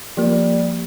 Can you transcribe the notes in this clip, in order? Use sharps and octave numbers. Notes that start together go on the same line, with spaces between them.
F3 G3 A#3